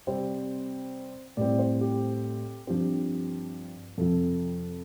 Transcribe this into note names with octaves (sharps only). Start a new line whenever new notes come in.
C3 G3 C4 C5
A2 G3 C4 D5
C5
G4
G2 F3 C4 G4
F2 C3 F3 A4